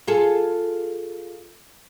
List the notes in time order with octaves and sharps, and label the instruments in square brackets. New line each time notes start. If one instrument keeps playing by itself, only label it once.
[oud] F4 G#4 A4